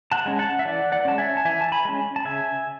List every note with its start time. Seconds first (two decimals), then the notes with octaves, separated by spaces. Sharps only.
0.12 F#5 A5
0.26 G#3 C#4
0.39 F#5 A5
0.59 E5
0.65 E3 D5 F#5
0.92 D5 F#5
1.05 G#3 C#4 A5
1.18 E5 G#5
1.37 A5
1.45 E3 E5 G#5
1.61 A5
1.72 G#5 B5
1.85 G#3 C#4
2.16 A5
2.25 C#3 E5 G#5